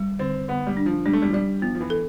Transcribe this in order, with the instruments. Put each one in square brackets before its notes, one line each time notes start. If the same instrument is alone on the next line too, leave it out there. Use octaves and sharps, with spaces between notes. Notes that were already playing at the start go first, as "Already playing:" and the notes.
Already playing: [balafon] G3
[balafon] D3 [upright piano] C4
[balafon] D3 [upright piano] B3
[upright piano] G3
[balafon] D4
[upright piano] F3
[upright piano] G3 [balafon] D4
[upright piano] A3
G3
F3
[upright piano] G3 [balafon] D5
[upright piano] F3 [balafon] B3
[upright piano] F3
E3
[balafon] A4